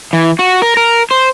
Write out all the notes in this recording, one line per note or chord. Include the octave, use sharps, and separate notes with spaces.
E3
F#4
A#4
A#4
C5